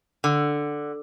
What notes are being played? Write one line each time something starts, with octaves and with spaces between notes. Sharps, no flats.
D3